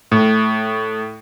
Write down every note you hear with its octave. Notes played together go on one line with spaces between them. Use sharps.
A2